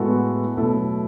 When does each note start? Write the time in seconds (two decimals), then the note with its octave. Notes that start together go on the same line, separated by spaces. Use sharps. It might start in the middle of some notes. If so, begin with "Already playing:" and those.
Already playing: A2 G#3 B3 F#4 A4
0.56 B2 F#3 A3 E4 A4